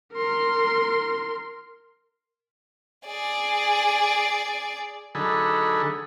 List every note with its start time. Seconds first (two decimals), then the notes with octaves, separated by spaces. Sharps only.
0.13 A#4 C6
3.06 G#4 D5
5.15 D3 F#3 D#4 G#4 A4 B5